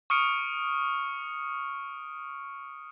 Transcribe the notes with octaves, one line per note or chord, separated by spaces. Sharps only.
C#6 D#6 F6 C#7 D7